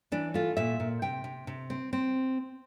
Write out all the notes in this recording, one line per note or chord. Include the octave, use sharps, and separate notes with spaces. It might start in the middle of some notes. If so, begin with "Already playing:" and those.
E3 D4
A3 F4
A#2 E5
A#2
C3 G5
C3
C3
C4
C4